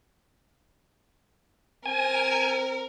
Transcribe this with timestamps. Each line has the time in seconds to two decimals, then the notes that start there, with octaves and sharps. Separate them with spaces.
1.86 C4 A#4 G#5